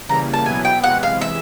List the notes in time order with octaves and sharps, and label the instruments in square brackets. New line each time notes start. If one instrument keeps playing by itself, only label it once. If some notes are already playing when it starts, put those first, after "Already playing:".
[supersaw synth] C#3 E3 G3 A#3 [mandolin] A#5
[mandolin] A5
[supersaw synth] B2 F#3 B3 E4 [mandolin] G#5
[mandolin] G5
[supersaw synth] C3 E3 G#3 [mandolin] F#5
[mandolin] F5
E5